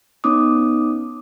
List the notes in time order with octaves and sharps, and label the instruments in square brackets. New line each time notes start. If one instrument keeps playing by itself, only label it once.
[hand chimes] B3 C#4 D#4 D6 D#6